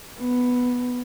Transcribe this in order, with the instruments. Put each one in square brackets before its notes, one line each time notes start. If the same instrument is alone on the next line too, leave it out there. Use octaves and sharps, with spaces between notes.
[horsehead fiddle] B3